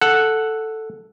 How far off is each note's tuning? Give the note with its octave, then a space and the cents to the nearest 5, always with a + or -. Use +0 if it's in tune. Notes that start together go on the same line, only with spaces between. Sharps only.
A4 +0 F#5 +0